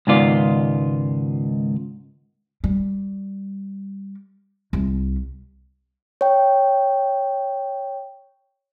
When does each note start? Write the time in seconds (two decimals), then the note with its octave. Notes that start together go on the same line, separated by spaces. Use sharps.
0.07 C#2 G#2 D#3 B3 F4 D5
2.64 G3
4.73 C2
6.21 C#5 G5